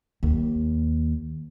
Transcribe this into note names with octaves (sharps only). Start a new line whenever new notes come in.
D#2